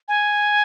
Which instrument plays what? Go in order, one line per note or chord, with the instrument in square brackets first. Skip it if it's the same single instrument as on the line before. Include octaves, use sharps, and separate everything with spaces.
[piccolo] G#5